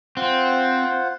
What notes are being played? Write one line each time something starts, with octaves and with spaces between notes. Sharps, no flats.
C4 F4 C5 F#5